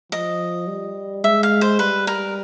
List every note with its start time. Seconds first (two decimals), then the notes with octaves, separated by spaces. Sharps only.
0.12 F3 D#5
0.68 G3
1.24 G#3 E5
1.43 F5
1.61 C5
1.79 G3 B4
2.07 A#4